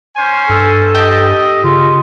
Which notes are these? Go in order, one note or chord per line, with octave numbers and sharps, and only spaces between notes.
C#4 C5 G#5
G2 A4
G4 D#5
C#3 F4